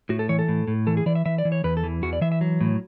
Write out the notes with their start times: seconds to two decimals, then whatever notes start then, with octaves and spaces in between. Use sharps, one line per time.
0.09 A2 F#4
0.19 A4
0.29 E3 C#5
0.39 A4
0.48 A2
0.68 A2
0.87 E3 A4
0.97 G#4
1.06 E3 D5
1.15 E5
1.26 E3 E5
1.38 D5
1.45 E3
1.52 C#5
1.64 E2 B4
1.77 A4
1.84 E3
2.03 E2 F#4
2.13 D5
2.21 E3 E5
2.32 E5
2.41 F#3
2.61 A2